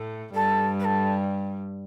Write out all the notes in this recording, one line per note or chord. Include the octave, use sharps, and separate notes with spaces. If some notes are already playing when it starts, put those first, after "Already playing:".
Already playing: A2 A3
G2 G3 A4
B4
A4